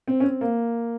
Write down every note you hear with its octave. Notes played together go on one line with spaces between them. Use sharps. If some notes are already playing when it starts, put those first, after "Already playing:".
C4
C#4
C4
A#3